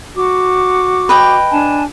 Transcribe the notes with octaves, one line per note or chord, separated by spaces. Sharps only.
F#4 D6
B4 D#5 G5
D4 G#5 A5